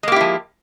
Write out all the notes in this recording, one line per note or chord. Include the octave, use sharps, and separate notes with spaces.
F3 G#3 A#3 E4 G4